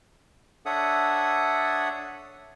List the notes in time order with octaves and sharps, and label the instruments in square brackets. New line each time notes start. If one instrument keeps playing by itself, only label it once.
[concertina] D4 A4 C#5 E5 F#5 D#6